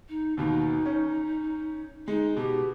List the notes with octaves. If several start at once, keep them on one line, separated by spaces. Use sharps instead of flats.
D#4
D#2 B2 D#4
C#4
G#3 D#4
B2 G4